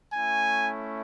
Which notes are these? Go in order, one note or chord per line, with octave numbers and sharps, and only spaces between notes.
A3 C#4 E4 G#5